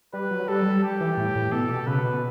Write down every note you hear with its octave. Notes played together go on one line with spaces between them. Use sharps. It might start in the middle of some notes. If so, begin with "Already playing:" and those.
G3 B4
F#3
G3 A4
F#3
G3
G4
E3
A2
A2
B2 A4
B2
C#3 B4
B2